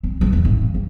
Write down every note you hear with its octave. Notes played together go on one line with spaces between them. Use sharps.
C4
G2 E3
E2 C3
G#1
F2
F1